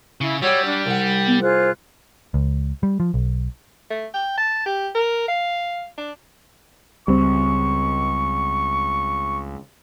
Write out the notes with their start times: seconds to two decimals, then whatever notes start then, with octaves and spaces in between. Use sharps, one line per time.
0.21 C#3 E4
0.42 G3 F#4 G4 C#5 E6
0.66 D4
0.86 C2 F#5 G5
1.27 B3
1.41 F4 G#4 C5 F#6
2.34 C#2
2.83 G3
3.00 F3
3.14 B1
3.90 A3
4.14 G5
4.37 A5
4.66 G4
4.95 A#4
5.28 F5
5.98 D4
7.08 C#2 G3 C4 C#6